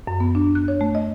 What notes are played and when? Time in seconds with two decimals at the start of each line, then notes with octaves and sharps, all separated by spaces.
0.07 F#2
0.20 B3
0.35 D4
0.55 F#6
0.68 C#5
0.81 A3
0.95 D#5